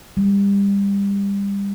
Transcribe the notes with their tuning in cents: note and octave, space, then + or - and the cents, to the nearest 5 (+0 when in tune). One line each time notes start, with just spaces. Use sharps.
G3 +30